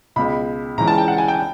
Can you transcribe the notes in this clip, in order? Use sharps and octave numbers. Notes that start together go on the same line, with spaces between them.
C#2 B2 G#3 B5
C#2 C#3 E3 G#3 A#5
A5
G5
F#5
G#5
G5